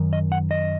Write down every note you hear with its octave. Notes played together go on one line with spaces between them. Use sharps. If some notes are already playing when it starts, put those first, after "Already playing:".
Already playing: F#2 D#3
D#5
F#5
D#5